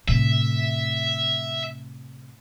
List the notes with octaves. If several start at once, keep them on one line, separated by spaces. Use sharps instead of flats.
A2 C3 E5